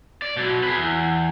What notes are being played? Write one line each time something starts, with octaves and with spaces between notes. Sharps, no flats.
D5
B2 F#3
G#4 B4
E2